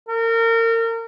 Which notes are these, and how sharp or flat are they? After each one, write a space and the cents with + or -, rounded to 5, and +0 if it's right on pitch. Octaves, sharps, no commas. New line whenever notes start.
A#4 -30